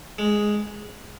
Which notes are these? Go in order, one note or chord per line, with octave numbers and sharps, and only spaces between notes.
G#3